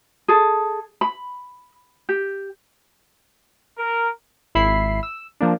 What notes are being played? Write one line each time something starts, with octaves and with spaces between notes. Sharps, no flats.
G#4 A4
B5
G4
A#4
G#1 E4 B5 C7
E6
F3 A#3 D4